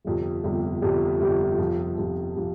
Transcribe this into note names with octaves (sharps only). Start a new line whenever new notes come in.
G1 F2 C3 G3
G1 F2 C3 G3
G1 F2 C3 G3
G1 F2 C3 G3
F2 C3 F3
F2 C3 F3
C3 F3